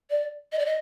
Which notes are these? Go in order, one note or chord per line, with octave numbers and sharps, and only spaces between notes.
D5
D#5
D5
D#5